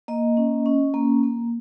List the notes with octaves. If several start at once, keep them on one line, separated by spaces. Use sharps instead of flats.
A#3 D#5
C#4
C#4
A#3
A#3